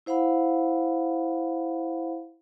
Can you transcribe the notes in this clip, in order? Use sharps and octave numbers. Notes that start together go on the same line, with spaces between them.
E4 C5 F5 F#5 B5